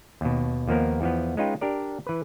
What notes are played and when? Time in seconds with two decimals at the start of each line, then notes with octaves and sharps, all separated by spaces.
0.21 D#2 B2
0.67 D#2 F3 A#3 B3 A#4
1.01 E2 F3 B3
1.37 G#3 C#4 D#4 F4 B4 G5
1.61 D4 G4 A#4 D5
2.07 E3 B4